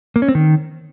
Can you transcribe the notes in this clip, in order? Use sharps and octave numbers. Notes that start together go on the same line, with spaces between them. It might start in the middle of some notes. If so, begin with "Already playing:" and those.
A#3
C#4
C4
D#3